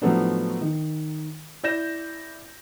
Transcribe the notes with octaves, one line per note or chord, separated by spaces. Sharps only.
A2 F3 F#3 A3 B3 D4
D#3
E4 D5 G6 A#6 E7